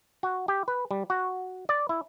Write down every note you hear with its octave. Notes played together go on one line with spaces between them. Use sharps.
F#4
G4
B4
G3
F#4
D5
E4